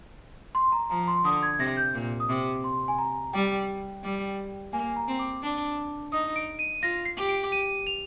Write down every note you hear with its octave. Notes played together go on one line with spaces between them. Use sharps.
C6
A#5
F3 A#5
C6
D3 D#6
G#6
G#6
C3 A#6
G6
A#2
D#6
C3 D6
C6
G#5
A#5
G3 G5
G3
A#3 G#5
A#5
C4
D6
D4
D#4 D#6
D7
D#7
F4 A#6
C7
G4
D7
D#7
F7